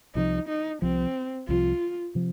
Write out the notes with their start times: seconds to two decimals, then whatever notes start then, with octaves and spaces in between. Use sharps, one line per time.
0.15 C2 C3 F3 D#4
0.48 D#4
0.82 C2 C3 F3 C4
1.48 C2 C3 F3 F4
2.15 C3 F3